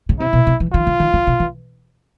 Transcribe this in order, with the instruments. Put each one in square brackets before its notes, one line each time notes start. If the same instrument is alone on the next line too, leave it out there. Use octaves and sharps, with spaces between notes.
[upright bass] C#3
[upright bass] C3 [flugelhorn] E4
[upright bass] B2
C3
E3
[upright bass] D#3 [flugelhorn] F4
[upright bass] D3
D#3
D3
C3
E3